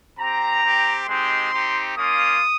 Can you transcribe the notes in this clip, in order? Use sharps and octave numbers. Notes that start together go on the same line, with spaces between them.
C4 G4 A#5
C4 G4
G#3 C4 D#4 G4 C6
C4 D#4 G4
A#3 C#4 F4 D#6